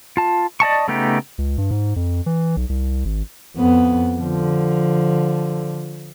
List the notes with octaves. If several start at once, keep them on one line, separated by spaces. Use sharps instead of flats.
F4 A5
D5 D#5 A5 C#6
C#3 A3 B3 D#4 G4
C#2
G2
G#2
F2
E3
B1
C2
G#1
F2 B3
D3 F3